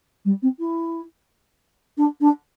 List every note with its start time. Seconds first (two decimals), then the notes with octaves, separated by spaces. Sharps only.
0.25 G3
0.42 C4
0.59 E4
1.97 D4
2.21 D4